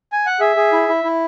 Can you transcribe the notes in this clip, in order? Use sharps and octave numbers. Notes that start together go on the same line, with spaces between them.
G#5
F#5
G#4 E5
G#4
E4
E4
E4